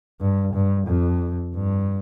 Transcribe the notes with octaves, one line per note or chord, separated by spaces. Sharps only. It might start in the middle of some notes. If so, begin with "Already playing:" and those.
G2
G2
F2
G2